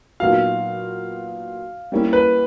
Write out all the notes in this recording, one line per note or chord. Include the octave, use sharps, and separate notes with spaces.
A#2 F#3 B3 D#4 F#4 F5
G3 A#3 C#4 E4
B4